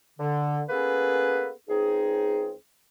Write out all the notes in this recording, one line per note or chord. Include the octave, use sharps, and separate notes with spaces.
D3
A#3 B3 C#4 G#4 A4 B4
C#2 C4 D#4 G#4